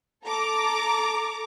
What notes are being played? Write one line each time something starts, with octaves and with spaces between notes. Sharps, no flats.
A4 A#5 D6